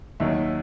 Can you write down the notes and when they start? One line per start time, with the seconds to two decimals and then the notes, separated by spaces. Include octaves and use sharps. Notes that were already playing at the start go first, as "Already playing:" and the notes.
0.20 D#2 D#3 F#3 E5